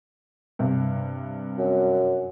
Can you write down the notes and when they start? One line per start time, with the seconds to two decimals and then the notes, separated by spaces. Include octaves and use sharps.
0.59 G2 C3
1.58 F#2